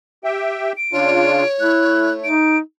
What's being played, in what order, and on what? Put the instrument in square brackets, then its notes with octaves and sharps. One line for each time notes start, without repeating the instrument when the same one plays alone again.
[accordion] G4 E5 G5
[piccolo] D7
[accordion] C#3 D4 F4 [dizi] C#5
[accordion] A3 [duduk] E4 [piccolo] F#6
[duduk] D#4 [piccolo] D7